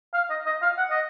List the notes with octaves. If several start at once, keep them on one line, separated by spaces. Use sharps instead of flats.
F5
D#5
D#5
F5
F#5
D#5